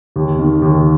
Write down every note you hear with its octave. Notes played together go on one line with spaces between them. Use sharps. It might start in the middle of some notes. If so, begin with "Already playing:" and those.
D#2
D#3
D#2